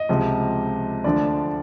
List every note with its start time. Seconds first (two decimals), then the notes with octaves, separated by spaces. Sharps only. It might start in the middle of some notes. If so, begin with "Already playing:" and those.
Already playing: D#5
0.09 C#2 C3 F3
1.04 D2 D3 F3 D5